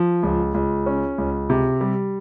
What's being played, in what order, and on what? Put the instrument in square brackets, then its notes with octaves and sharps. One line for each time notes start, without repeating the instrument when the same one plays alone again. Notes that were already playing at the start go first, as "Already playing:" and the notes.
Already playing: [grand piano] F3
C#2
C#2
C#4
C#2
C3
G3